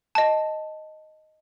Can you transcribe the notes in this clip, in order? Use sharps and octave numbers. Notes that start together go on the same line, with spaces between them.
D#5 A5